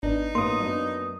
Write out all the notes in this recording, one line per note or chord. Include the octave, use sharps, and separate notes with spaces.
G#1 B3 D4 D#4
A1 A#3 B3 C6 D#6
F#2 B3 D4